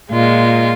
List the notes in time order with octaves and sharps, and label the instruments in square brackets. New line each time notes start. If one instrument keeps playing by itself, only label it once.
[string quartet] A#2 G#3 F4